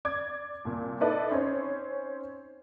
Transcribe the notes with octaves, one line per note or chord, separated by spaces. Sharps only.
D5 D6 G#6
C2 A#2
D#4 E4 A4 B4 D5 D#5
C4 C#4 D#4 C5 C#5